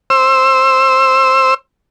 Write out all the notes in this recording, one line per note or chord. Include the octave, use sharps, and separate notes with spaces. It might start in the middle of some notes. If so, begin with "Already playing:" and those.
C5 E6